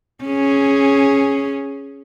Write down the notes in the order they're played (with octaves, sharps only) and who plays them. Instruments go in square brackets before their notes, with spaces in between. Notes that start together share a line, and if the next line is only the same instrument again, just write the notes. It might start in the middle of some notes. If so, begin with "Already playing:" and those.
[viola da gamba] C#4 G#4